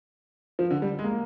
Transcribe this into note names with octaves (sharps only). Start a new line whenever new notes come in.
F3
D3
G3
G#3
A#3